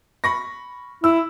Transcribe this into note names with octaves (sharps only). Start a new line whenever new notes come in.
B5 C#6 A#6
E4 E6